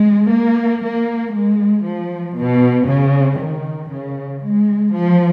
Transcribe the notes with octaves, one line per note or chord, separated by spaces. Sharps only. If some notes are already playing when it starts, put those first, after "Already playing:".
Already playing: G#3
A#3
A#3
G#3
F3
B2
C#3
D#3
C#3
G#3
F3